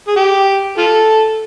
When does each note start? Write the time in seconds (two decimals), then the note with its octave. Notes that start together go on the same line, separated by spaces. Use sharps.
0.08 G#4
0.16 G4
0.78 F4 A4